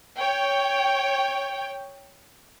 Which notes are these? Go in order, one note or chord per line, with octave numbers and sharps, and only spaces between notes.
C#5 G5